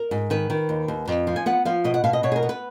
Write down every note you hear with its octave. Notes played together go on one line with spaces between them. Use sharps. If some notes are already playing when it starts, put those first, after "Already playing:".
Already playing: A#4
G#2
D#3 B4
D#3
D#2
D#2
F2
F3
G#5
B3 F#5
F3 F5
B2 D#5
F#5
B2 F5
D#5
B2 C#5
G#4
A#4
B3
B4